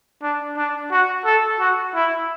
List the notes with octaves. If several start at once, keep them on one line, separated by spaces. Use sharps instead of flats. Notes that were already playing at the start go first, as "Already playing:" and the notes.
D4
D4
F#4
A4
F#4
E4